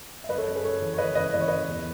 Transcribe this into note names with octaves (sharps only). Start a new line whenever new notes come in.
E5
F#2 B4 D#5
A4 C#5
F#2
G#4 B4
F#2 A4 C#5
E3
C#5
E3 B4 D#5
E3 B4 D#5
E3 D#5
C#5
E3 B4 D#5
E2